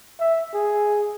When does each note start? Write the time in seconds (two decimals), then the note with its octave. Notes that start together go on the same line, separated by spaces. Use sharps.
0.20 E5
0.54 G#4